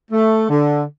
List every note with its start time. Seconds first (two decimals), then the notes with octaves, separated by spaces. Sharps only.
0.12 A3
0.49 D3